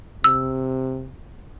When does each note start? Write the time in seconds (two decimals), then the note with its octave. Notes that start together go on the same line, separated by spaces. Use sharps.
0.24 C3 E6